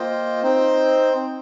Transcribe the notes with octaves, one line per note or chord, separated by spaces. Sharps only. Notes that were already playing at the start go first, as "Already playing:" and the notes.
Already playing: A#3 F4 C5 D#5 G5
C4 D#4 C5 G5